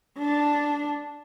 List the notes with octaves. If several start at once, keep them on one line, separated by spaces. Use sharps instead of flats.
D4